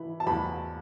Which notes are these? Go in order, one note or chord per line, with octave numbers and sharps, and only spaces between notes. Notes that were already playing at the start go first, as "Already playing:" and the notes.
Already playing: E3 B5
A5
E2 B5